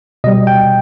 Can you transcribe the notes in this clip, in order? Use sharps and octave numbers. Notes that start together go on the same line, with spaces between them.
B2 G3 D#5
G5